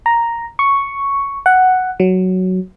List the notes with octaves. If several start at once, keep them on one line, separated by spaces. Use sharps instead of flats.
A#5
C#6
F#5
F#3